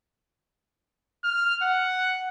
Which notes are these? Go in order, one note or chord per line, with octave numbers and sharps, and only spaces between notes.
F6
F#5